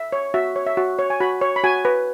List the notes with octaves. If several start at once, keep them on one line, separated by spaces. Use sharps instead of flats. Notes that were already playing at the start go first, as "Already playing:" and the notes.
Already playing: E5
C#5
F#4 E5
C#5
E5
F#4
C#5
G#5
F#4 B5
C#5
B5
F#4 G#5
B4